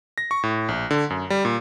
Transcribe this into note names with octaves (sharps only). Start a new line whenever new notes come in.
A#6
C#6
A2
A#1
D3
F#2
G3
A#2